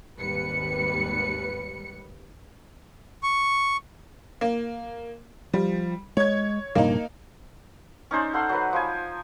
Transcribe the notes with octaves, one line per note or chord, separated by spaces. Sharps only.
G#1 D#2 G3 B4 C#7
C#6
A#3
F3 G3
G#3 C#5 G#6
A#1 G2 C3 A#3 D#4
C#4 D#4 C5 D5
A4 F#5 C6
F#3 B4
F3 C5 G#5